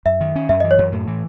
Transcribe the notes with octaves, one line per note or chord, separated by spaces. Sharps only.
F#2 E5
D#3
C#4
F#2 E5
E3 D#5
C#5
F#2
A2
E3